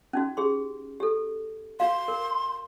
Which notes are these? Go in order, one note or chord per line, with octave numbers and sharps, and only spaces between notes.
C#4 D#4 F#4
G4 G#4 C6
G4 A4
F#4 F5 C6
A#4